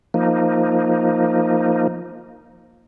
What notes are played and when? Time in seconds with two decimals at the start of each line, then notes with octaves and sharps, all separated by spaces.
0.14 F3 A#3 D#4